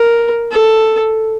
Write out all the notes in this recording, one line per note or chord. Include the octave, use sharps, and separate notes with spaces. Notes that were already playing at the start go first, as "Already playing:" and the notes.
Already playing: A#4
A4